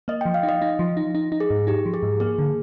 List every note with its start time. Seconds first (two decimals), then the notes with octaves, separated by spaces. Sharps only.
0.08 A#3 D#5
0.21 G5
0.25 F3
0.34 F5
0.43 D#4
0.49 D#5
0.62 D#4
0.79 F3
0.97 D#4
1.15 D#4
1.32 D#4
1.40 G#4
1.50 G#2
1.67 D#4 G4
1.86 F3
1.94 G#4
2.03 G#2
2.20 A#3 G#4
2.39 D3